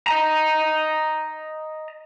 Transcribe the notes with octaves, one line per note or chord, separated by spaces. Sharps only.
D#5 A#5